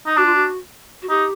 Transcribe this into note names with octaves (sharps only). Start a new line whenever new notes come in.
D#4
D4 F#4
F4
F#4
F#4
D#4 G4